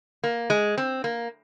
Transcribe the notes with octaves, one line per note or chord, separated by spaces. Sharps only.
A#3
G#3
C4
A#3